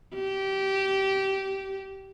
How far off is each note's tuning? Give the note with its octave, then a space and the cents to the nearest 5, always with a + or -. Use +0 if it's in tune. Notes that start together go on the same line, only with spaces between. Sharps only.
G4 -20